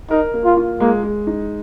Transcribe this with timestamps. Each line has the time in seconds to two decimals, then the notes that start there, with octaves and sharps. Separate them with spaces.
0.10 D#4 A#4
0.34 A#3
0.45 F4
0.57 F4
0.80 G#3 A#3
1.03 G#3
1.27 D#4